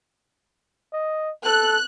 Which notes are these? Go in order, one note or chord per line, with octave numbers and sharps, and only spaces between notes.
D#5
A4 F#6